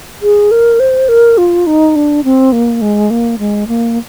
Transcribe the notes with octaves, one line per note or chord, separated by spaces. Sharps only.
G#4
A#4
C5
A#4
F4
D#4
D4
C4
A#3
G#3
A#3
G#3
A#3